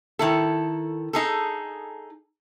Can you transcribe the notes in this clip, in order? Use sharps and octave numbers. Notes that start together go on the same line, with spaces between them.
D#3 E4 A4
D#4 G#4 A4